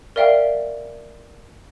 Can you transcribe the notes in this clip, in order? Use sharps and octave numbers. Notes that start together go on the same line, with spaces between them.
A#4 D5 E5 F5 G5